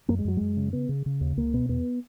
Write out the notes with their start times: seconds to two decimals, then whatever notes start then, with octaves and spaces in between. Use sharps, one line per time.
0.08 F#2 A#3
0.19 G#3
0.25 F#2 F#3
0.37 F#2 G#3
0.57 C#3
0.73 C#3 B3
0.89 C#3
1.06 C#3
1.21 D#2
1.37 C#2 A#3
1.53 B2 B3
1.69 E2 B3